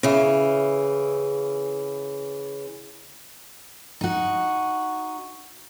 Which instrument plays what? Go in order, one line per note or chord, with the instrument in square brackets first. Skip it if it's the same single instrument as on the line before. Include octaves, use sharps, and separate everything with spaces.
[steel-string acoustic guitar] C#3 E3
D#4 F#4